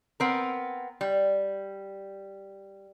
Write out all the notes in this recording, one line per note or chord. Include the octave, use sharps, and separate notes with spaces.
B3 C4 A#4
G3